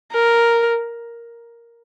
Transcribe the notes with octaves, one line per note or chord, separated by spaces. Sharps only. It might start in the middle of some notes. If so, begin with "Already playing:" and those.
A#4